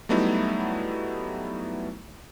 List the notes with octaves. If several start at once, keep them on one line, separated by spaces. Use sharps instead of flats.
F#3 G3 A3 B3 D#4 E4